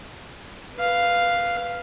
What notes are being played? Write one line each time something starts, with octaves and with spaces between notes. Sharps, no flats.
B4 F5